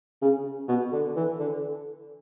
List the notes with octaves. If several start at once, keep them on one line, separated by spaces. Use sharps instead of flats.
C#3
B2
D3
E3
D3